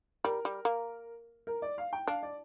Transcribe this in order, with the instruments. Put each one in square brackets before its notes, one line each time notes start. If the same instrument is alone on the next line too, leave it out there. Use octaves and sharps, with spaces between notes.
[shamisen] G3 [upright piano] A#4
[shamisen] G3
A#3
[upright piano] A#4
D5
F5
G5
[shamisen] D4 [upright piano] F5
[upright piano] D5